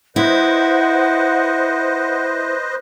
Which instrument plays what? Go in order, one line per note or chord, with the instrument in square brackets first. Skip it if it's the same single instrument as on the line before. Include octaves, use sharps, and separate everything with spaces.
[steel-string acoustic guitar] E4 [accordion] B4 C5 D#5 [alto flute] F#5